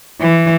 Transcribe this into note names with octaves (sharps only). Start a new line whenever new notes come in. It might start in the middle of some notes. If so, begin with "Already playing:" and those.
E3